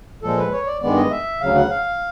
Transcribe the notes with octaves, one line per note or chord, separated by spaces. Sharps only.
A#2 F3 G#3 A4
B4
C#5
D5
G2 D#3 G#3 B3 D5
D#5
E5
D2 C#3 F#3 F5
F#5
F5